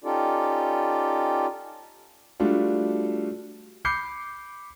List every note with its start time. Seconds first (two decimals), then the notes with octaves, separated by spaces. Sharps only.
0.04 C#4 D#4 F4 G4 A4 D5
2.40 G3 A3 D4 F4 F#4
3.85 B5 D6 G6 C7 C#7